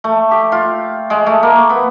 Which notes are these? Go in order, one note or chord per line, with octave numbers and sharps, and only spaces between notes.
A3
G4
F4
G#3
A3
A#3
B3